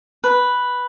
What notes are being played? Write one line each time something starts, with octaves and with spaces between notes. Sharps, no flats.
B4